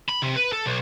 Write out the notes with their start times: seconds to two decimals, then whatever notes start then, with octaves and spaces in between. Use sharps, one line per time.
0.09 B5
0.23 C3
0.36 B4
0.53 A4
0.66 B1